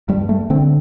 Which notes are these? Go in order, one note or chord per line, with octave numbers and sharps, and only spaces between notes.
G2 G3
A3
D3 C4